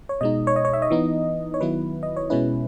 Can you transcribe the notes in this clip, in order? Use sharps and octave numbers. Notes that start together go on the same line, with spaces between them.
C#5
B2 G#3 D#4 D#5
C#5
D#5
C#5
E5
D#5
E3 B3 D#4
C#5
D#3 F#3 B3 E4 B4
D#5
C#5
B2 G#3 C#4 E4 B4